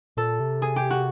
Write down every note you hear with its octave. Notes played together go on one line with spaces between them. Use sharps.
A#2 A4
C3
G#4
G4
F#4